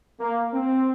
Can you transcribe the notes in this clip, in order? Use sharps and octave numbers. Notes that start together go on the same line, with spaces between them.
A#3
C4